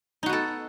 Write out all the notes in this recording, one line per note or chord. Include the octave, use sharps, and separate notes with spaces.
B3 D#4 F#4 A4